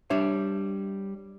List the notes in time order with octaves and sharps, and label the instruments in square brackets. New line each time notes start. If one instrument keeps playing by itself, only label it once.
[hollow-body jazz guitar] G3 D4 C#5 E5